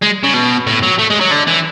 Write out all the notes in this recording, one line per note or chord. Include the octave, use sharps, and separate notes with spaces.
G#3
C#3
B2
A2
F#3
A3
G#3
F#3
D3
E3